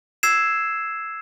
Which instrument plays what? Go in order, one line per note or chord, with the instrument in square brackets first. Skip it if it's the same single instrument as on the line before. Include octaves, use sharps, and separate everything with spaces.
[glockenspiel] E6 G#6 C7 E7